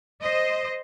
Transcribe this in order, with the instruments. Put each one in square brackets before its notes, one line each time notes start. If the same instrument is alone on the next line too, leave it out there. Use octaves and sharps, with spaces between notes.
[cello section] C5 D#5